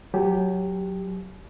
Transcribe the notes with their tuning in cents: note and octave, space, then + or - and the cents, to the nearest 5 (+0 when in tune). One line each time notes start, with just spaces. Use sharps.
F#3 +0 G4 +0 G#5 +45